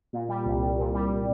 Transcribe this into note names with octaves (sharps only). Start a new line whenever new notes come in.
A#2
G3
C2
C2
A#2
G3